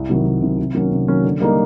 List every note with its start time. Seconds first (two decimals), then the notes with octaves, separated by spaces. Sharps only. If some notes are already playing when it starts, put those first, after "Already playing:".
Already playing: C2
0.09 C3 D#3 F#3
0.26 C2
0.42 C3 D#3 F#3
0.59 C3
0.75 D#3 F#3 A#3 C#4
0.91 C3
1.08 D#3 F#3 A#3 C#4
1.24 D3
1.40 G3 A#3 D#4